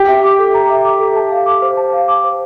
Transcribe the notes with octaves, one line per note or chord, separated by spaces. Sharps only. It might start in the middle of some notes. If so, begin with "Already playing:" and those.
Already playing: G4
E5
D6
A4
A#5
E5
D6
A4
A5
F5
D6
C5
A5
F5
D6
C5